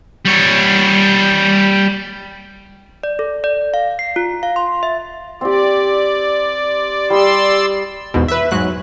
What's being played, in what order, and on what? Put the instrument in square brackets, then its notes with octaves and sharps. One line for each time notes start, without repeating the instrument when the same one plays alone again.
[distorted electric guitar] G3 C#5
[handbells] D5
A4
D5
F5
C7
F4
F5
C6
E5
[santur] C4 G4 [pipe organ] D5
[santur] G3 D#5 [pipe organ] D5 C6 E6
[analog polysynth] E2 G#2 B2
B4 E5
G#2 F#3 F#6